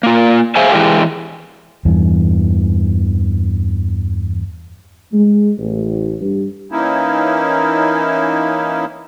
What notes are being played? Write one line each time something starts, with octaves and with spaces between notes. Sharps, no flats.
A#3 F4
G#4 C5 E5 F5 G#5
E3 G#3 G4
E2 G2 E3
G#3
A1
G2
E3 A#3 C#4 D#4 E4